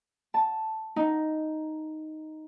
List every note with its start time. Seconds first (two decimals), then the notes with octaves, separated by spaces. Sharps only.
0.34 A5
0.96 D#4